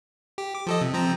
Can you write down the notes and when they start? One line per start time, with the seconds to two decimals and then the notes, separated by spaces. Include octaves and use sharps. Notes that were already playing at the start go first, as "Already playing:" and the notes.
0.38 G4
0.55 D6
0.67 F3 A4 D#5
0.81 C3
0.94 F3 C4 A#5